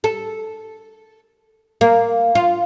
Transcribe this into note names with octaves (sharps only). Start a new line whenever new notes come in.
A4
A#3
F4